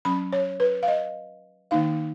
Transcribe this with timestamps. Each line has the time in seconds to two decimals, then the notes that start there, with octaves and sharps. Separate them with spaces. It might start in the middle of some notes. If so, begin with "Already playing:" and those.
0.05 F#3 C#4 B5
0.33 C#5
0.60 B4
0.83 F5
0.88 D#5
1.71 D#3 A#3 D#4 F5